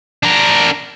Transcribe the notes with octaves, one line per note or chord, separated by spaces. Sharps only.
D4 A#4